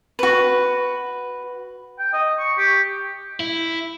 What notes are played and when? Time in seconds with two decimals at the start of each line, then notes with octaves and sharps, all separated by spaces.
0.19 F#4 B4
1.99 G5
2.13 D#5
2.39 C#6
2.58 G4
3.40 E4